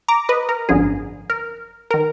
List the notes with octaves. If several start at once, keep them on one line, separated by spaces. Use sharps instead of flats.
A#5 D6
B4 D#5
A#4
G#1 F#2 D3 F3 G#4
A#4
A#4
D#3